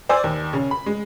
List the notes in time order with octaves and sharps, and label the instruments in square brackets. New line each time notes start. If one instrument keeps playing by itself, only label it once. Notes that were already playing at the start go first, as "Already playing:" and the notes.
[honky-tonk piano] C5 D5 G#5 E6
D#2
C#3 C#4
B5
G#3